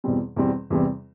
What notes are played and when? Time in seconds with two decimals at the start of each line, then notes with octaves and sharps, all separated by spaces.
0.04 E2 B2 G3 C4
0.36 E2 B2 G3 C4
0.70 E2 C3 E3 G3 C4